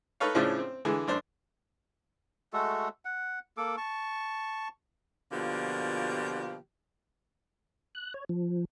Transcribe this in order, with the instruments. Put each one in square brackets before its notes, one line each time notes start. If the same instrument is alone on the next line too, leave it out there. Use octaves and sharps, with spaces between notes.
[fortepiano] D#4 A4 B4 C#5 F5
A2 C#3 F3 C#4 D4
C4
D3 E3 G#3 G#4
F#2 D4 C5
[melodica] G#3 A3 F#4 A4
F#5
A#3 A4 D6
A5 C#6
[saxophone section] B2 D3 F3 A#3 F4 G4
[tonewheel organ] F#6
C#5
F3